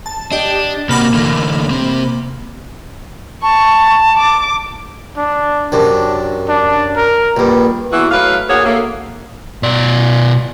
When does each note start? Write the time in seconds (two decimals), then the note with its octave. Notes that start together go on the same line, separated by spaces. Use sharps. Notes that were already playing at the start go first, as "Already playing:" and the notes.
0.06 A5
0.32 D4 G4 D#5
0.89 C3 A#3 F#4 B5 D6
1.14 D3 E3 A3
1.70 C3 C4
3.43 A5 C#6
4.17 D6
5.17 D4
5.72 F#2 C3 D4
6.49 D4
6.96 A#4
7.37 A#1 G2 G3
7.92 E2 E3 B3 F#4
8.11 A2 F#3 B4 F5
8.49 D2 A#3 F#4 G#4 C#5
8.65 A3 A#3
9.63 B2 D5